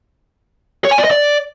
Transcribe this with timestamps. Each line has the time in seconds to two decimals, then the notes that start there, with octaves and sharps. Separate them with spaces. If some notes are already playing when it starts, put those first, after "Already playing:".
0.85 C#5
0.91 G#5
0.98 D5
1.04 D#5
1.11 D5